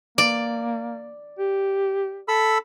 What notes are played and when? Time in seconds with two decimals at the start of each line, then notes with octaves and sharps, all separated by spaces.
0.18 A#3 D5
1.38 G4
2.28 A4 B5 E6